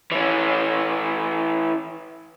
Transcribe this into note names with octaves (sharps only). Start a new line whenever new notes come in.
E3 C#4